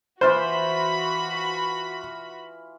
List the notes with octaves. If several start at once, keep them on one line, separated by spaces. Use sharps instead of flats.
E3 F4 F#4 B4 C5 B5